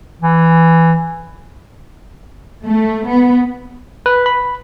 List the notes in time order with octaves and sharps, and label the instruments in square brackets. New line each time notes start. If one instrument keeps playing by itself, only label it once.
[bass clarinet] E3
[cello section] A3
B3
[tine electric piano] B4
B5